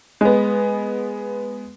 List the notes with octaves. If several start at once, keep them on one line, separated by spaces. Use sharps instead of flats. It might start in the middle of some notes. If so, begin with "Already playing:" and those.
G#3 B3